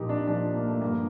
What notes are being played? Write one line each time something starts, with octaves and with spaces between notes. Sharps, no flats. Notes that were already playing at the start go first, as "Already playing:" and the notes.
Already playing: A#2 F3 D#4 G4
D4
A#2 F3 D4
A#3
A3
G2 D3 F3 A#3